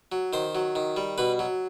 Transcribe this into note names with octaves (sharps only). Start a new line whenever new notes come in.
F#3
D#3 C5
F#3
D#3
G3
B2 B4
F#3